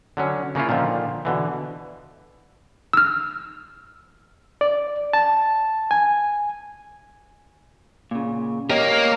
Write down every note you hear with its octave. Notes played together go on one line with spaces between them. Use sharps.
D3 F#3 C#4
C#3 A#3 C#4 E4 F4
A#2 D3 D#3 F3
B2 D3 E3
E6 F6
D5
A5
G#5
A#2 C#3
A#3 G4 A#4 C#5 D#5